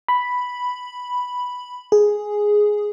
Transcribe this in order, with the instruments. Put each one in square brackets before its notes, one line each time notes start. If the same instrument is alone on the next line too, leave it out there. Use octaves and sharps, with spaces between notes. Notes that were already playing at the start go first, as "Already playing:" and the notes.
[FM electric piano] B5
G#4